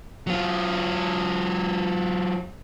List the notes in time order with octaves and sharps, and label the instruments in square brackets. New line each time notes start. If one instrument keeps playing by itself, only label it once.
[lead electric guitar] F#3 F4